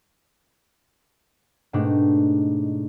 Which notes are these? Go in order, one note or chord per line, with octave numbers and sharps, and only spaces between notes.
G#2 B2 A3 D4 D#4 G4